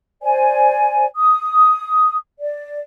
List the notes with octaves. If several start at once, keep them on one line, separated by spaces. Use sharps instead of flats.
C5 D5 G#5
D#6
D5